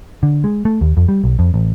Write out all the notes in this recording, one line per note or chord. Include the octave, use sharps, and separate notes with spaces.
D3
G#3
A3
D#2
F2
G3
B1
F2
A1